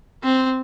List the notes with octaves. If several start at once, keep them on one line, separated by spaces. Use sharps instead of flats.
C4